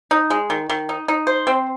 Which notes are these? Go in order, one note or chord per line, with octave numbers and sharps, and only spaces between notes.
D#4
G#3
D#3
D#3
D#4
D#4
C5
C4